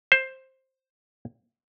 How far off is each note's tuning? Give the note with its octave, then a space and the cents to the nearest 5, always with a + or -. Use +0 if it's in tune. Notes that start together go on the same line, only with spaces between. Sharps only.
C5 +10